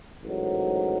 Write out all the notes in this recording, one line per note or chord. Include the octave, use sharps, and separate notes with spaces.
A1 G#2 F#3